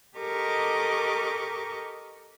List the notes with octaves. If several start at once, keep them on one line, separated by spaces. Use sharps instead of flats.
G4 A4 A#4 D#5 C#6 D6